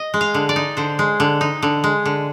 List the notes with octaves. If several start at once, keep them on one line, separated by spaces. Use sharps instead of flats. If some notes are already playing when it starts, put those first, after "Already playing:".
Already playing: D#5
G#3
F5
D3
D5
D#4
D3 C5
G#3
D3
D#4
D3
G#3
D3